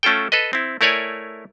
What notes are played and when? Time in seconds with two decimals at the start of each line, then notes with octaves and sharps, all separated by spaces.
0.03 A3 C#4 F4 A4 G5
0.32 A4 B4 D#5
0.53 C4 E4
0.81 A3 E4 A#4 C#5 D5 G#5